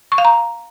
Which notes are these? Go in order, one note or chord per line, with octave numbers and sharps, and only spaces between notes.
C#6
F5
A#5